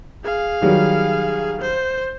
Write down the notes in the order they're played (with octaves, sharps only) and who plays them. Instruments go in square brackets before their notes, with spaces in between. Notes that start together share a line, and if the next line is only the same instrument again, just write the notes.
[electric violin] G#4 F5
[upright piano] D#3 F#3 G3
[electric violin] C5